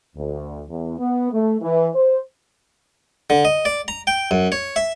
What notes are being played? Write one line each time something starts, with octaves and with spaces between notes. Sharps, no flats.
D2
E2
B3
A3
E3
C5
D3
D#5
D5
A#5
G5
F#2
C#5
E5